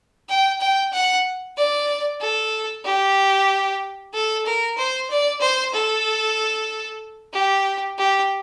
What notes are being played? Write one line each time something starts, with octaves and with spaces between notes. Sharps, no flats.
G5
G5
F#5
D5
A4
G4
A4
A#4
C5
D5
C5
A4
G4
G4